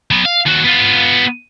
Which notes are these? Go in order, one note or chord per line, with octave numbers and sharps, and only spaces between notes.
F#3 B3
F5
D#2 F#4
B3 F4